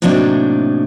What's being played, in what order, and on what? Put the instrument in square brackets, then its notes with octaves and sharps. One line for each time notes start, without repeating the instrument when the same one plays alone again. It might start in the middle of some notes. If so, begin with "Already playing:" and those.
[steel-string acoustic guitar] A2 C3 F#3 A#3 D4 D#4